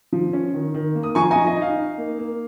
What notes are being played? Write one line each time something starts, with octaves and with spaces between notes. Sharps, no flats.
F3
C#4
D#3
D#3
A#3
D#6
F3 G#5 C#6
F3 D#5 G#5
D#5
D#4
F5
D#4
A#3
A#3